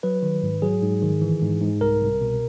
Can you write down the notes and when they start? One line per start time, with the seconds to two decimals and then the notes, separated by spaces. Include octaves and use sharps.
0.03 F#3 B4
0.23 D#3
0.43 G#2
0.62 F#3 G#4
0.82 G#2
1.03 D#3
1.22 E3
1.42 G#2
1.61 G#2
1.81 C2 A#4
2.00 C2
2.21 B2